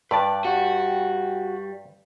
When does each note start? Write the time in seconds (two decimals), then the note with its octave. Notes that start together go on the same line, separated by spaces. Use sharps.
0.11 G2 B4 D5 A5
0.45 G3 F#4